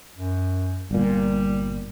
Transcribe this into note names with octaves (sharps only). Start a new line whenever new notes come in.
F#2
G1 A#2 G3